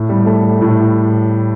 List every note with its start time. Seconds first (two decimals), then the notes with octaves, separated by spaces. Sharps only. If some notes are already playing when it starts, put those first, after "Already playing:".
Already playing: A2
0.09 G3
0.26 A3
0.61 A2